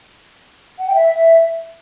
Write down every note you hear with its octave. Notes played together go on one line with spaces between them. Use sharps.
F#5
G5
E5